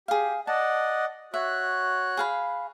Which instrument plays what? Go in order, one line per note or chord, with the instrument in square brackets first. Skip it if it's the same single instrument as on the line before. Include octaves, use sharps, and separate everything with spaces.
[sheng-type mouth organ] G4 [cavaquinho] G#4 F5
[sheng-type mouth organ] D5 D#5 F#5 [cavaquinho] A5
[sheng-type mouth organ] F#4 C#5 F#6 [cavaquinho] E5
[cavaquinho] G#4 F5 B5